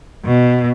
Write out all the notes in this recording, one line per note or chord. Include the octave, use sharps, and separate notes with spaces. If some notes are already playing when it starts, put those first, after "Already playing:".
B2